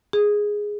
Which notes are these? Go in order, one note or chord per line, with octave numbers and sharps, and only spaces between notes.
G#4